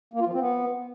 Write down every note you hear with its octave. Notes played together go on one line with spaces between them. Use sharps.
A#3
F4
F3
C4
B3